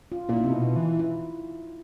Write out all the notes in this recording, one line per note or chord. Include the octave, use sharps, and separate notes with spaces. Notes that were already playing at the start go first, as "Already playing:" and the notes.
F4
A#2 E4
D#4
C3 E4
B2
E3
E4